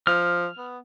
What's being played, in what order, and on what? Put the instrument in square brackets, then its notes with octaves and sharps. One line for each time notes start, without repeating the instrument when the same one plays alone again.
[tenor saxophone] F3 [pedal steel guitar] F6
[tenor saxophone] B3